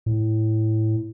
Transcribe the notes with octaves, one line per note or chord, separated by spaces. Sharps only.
A2